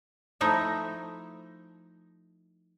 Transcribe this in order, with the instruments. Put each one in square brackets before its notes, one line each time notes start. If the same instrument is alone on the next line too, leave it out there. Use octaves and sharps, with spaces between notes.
[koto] F3 A3 D#4 E4 E5